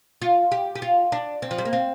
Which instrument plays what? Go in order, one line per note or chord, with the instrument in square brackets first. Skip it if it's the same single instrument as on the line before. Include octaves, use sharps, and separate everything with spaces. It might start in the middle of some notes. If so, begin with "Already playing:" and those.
[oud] F4
G4
G4
F4
D4
C4
F3
G3
A#3
C4